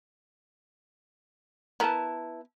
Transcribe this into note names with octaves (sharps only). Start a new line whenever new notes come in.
B3 E4 A#4 B4 A5